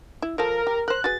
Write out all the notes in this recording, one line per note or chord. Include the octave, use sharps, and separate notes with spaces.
E4
F3 F4 A4 A#4
G4
A#4 C5 F#6
F#4 G#4 B4 A6